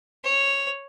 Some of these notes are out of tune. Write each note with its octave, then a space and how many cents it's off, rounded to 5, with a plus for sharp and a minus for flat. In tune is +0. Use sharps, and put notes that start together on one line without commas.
C#5 -5